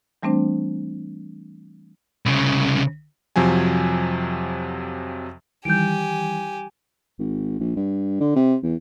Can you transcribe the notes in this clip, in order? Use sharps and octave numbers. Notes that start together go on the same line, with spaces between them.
E3 G3 A3 C4 D4 C5
C2 C#3
F2 C3 F3 F#3 G#5
D#3 E3 G3 G4 G#5 G6 D7
G#1
A#1
G2
D3
C3
E2